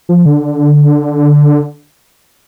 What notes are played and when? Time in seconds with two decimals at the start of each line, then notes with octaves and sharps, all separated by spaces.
0.09 F3
0.26 D3